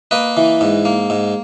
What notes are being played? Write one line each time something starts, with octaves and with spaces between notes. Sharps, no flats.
A#3 B4 D#5
E3
G#2
A#3
G#2